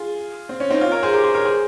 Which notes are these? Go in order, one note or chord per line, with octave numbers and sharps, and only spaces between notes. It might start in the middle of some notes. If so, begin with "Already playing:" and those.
Already playing: F4 G#4
C4
C#4
C4 D#4
C#4 F4
A#4 C#5
G#4 C5
G4 A#4
G#4 C5
A#4 C#5
G#4 C5